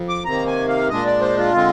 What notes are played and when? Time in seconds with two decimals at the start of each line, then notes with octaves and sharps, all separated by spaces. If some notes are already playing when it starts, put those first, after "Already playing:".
Already playing: F2
0.09 D6
0.25 C3 D#3 A#3 A#5
0.47 G#5
0.68 F5
0.90 A#2 G#3 D4 D#5
1.06 D5
1.21 C5
1.37 F4
1.54 D3 G#3 C4